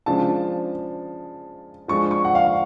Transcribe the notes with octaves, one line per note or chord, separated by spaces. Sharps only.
C#3 F3 G#3 D4 A5
F3 G#3 D4 C#6
C#6
F#5
F5